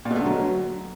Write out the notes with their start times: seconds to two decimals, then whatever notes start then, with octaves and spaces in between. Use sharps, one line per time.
0.05 A#2
0.10 B2
0.16 A3
0.21 D3
0.26 F#3